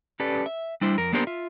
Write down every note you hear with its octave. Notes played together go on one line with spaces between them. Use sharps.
C#4 G4 A4 B4 D5
E5
G3 D4 E4 C5
F2 A#4
A#3 B3 D4 G4 A#4 C5
F4 E5